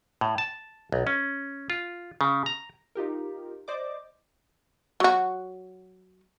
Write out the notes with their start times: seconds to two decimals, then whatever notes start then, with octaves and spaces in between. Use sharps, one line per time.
0.21 A2
0.38 A5
0.92 B1
1.07 C#4
1.70 F4
2.21 C#3
2.46 A#5
2.95 D#4 F4 G4 A#4
3.68 C5 D5 D#5 D6
5.00 F#3 F#4